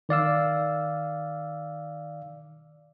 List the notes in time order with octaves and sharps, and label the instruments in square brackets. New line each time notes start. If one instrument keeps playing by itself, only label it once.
[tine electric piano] D#3 D5 F5 E6